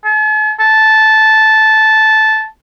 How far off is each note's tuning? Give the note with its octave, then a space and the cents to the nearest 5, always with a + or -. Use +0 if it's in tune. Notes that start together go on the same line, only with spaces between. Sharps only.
A5 -45
A5 -10